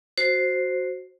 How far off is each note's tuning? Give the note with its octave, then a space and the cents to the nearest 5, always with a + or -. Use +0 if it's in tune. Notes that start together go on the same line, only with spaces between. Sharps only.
F#4 +0 C5 +0